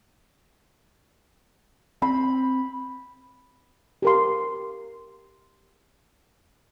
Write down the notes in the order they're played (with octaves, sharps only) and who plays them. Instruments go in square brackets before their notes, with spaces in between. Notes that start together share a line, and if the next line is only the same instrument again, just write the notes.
[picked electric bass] C4 [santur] B5
[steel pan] G4 A#4 C6